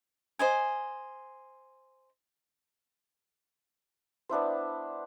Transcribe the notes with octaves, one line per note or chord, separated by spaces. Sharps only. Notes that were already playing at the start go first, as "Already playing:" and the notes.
C5 D#5 G#5
B3 D4 E4 C5